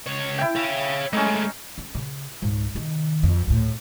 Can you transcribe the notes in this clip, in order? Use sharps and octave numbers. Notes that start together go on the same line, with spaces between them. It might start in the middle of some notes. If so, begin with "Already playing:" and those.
C#2 C#5
E4 G5
C#5 F5
G#3 A3 C#4 D#4
C#4
C#3
C#2 G#2
C3 D#3
F2
D2 A2